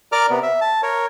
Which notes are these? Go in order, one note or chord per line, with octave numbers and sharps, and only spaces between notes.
A#4 D5 A#5 D6 F6
C3 B3
E5
A5
A#4 C#5